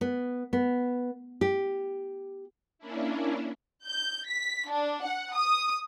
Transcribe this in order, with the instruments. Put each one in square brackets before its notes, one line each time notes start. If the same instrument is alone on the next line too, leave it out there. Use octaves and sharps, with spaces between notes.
[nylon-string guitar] B3
B3
G4
[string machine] A#3 C#4 D4 E4
[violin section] G6
B6
D4
F#5
D#6